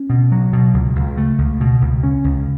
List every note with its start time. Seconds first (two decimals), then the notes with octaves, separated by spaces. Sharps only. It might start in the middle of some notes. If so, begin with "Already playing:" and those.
Already playing: C#4
0.10 B2
0.32 F#3
0.53 B2
0.74 C#2
0.96 C#2
1.17 A3
1.38 C#2
1.60 B2
1.81 C#2
2.03 C#4
2.24 C#2